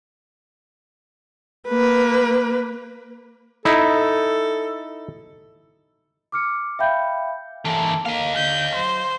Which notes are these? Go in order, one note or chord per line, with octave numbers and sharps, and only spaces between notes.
A#3 B4
D#4 E4 A4
D6 F6 C#7
E5 F5 G5 B5 G6
E3 A#3 A4
A#3 D#5 F5
D3 G6
F#3 C5